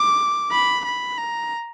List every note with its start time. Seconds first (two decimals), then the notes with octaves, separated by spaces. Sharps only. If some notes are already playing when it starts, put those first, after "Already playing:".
Already playing: D6
0.52 B5
0.85 B5
1.18 A#5